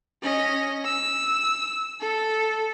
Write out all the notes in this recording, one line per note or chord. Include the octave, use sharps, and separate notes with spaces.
C#4 D#5
E6
A4